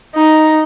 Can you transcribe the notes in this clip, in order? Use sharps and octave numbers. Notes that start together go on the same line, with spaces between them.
D#4